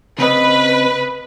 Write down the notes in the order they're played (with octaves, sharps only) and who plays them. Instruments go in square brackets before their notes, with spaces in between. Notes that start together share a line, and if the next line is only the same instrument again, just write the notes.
[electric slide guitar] C#3 C4 D#5 [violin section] B4